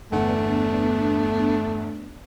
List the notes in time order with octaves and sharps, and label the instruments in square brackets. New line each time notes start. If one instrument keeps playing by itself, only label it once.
[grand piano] G1 E2 F#5 [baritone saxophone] A3 [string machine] B3 D4